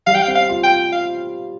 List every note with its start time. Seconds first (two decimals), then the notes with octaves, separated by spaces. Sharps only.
0.07 G3 F5
0.15 G5
0.22 F5
0.28 C4
0.35 F5
0.49 F4
0.63 G5
0.92 F5